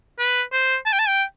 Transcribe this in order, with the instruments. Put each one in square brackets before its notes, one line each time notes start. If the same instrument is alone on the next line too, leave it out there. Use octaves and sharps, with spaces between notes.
[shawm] B4
C5
A5
G5
A5
G5